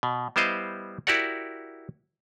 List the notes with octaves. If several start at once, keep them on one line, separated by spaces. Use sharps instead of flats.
B2
G3 B3 E4 C5 D#5 F5
E4 F#4 G4 A#4 D5 F#5